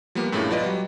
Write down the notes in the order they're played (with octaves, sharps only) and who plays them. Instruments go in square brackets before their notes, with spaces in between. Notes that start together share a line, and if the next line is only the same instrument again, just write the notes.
[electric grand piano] F3 G3 A#3 B3
G2 A#2 G#3 A3 C#4 E4
F3 B3 F4 B4 D5 D#5
F#3 G3